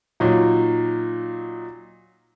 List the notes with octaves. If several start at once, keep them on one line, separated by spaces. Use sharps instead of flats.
A#2 F#3 D#4